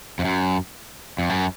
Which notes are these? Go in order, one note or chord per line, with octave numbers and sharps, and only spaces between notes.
F2
F#2
F2
F#2